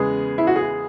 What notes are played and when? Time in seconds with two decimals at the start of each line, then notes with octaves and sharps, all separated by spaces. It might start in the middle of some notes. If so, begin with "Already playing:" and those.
Already playing: E2 C#3 G#3 B3 G#4
0.38 E4
0.47 F#4
0.56 G#4